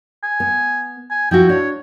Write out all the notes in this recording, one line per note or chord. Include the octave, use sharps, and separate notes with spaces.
G#5
B3
G#5
F3 E4 F#4 G5
D4 C#5